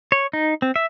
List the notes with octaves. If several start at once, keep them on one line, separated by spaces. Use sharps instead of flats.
C#5
D#4
C4
E5